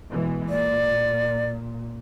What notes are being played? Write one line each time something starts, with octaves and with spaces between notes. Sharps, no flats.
B2 E3 G#3
A#2 D5